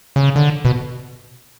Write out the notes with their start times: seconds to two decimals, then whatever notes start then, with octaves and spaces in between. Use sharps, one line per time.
0.16 C#3
0.36 D3
0.65 B2